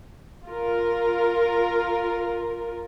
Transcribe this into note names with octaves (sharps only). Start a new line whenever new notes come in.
F4 A#4